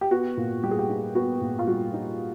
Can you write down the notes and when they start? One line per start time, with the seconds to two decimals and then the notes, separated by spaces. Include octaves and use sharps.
0.01 G4
0.11 B3 F#4
0.37 A#2
0.63 G3 G4
0.71 G#4
0.79 G4
0.89 D#4
1.15 B3 F#4
1.41 A#2
1.59 F4
1.67 G3 F#4
1.93 D#4